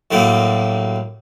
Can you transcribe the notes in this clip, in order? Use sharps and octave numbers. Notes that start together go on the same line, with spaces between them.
F#2 A2 G3 A#3